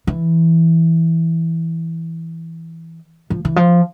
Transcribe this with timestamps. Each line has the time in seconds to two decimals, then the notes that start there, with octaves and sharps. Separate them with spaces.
0.07 E3
3.30 F3
3.45 E3
3.56 F3